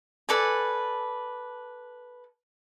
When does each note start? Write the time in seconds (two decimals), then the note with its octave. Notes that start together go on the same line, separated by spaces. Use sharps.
0.29 A4 B4 D5 G#5